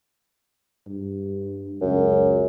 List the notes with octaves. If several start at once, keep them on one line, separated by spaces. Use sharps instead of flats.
G2
C#2 F#2